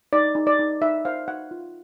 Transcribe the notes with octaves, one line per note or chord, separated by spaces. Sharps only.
D#4 D5
D#4
D5
D#4
D#4 E5
C5 F5
D#4 F#5
F4